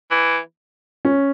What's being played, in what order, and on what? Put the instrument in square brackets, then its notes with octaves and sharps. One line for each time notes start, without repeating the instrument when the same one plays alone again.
[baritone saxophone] E3
[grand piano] C#4